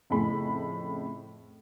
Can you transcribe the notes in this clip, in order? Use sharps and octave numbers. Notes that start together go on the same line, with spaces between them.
F2 A2 C#3 A3 B5